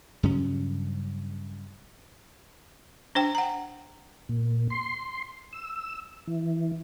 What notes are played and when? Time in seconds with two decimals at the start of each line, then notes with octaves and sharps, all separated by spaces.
0.23 G2 C#3 F#3 C#4
3.15 D4 C5 G5
3.35 F#5 A#5
4.29 A#2
4.70 C6
5.53 E6
6.27 E3